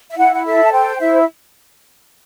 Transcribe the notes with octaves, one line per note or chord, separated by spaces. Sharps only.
E5
E4 F#5
F#5
A4 E5
A5
C5 G5
E4 E5